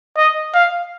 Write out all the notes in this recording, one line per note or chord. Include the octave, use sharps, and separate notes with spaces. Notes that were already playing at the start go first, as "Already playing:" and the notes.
D#5
F5